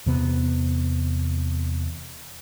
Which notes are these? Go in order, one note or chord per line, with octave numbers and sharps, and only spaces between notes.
E2 C3 B3